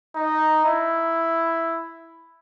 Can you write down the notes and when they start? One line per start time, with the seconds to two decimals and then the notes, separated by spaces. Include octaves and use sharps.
0.15 D#4
0.65 E4